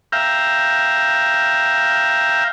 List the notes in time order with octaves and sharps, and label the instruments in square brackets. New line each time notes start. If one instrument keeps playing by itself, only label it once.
[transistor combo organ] E5 F5 G5 A#5